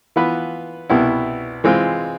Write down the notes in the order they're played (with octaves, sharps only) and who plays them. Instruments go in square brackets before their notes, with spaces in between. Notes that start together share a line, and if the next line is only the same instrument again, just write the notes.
[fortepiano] E3 B3 F4 B4
C2 B2 B3 E4
E3 G#3 C4 F4